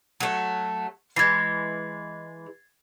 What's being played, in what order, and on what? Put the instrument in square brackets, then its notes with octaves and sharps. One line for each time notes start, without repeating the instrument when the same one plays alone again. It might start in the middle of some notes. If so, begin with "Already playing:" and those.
[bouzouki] F#3 A3
[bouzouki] E3 G#3 [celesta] G#6 A6 C7